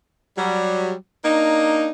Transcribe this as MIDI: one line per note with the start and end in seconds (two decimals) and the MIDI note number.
0.37 0.93 54
0.37 0.93 55
1.25 1.89 58
1.25 1.89 62
1.25 1.89 63